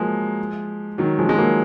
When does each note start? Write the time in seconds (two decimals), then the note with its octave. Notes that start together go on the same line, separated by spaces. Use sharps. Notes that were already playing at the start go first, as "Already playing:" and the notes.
Already playing: F3 F#3 G#3 A#3
0.98 D#3 F#3
1.19 F3 G#3
1.29 G#3
1.38 F#3 A#3